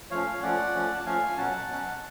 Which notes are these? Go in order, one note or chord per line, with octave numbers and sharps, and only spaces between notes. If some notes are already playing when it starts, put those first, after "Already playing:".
F3 A3 C#4 C#5 F5
F3 A3 C#4 D5 F#5
F3 A3 C#4
A5
F3 A3 C#4 F5 G#5
B2 F#3 C#4 F#5 A5
B2 F#3 C#4